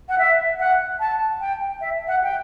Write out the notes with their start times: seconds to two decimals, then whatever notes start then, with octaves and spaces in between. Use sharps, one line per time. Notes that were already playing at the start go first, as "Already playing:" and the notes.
0.09 F#5
0.18 E5
0.59 F#5
1.00 A5
1.40 G5
1.81 E5
2.07 F#5
2.23 G5